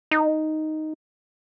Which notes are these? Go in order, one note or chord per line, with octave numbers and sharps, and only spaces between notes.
D#4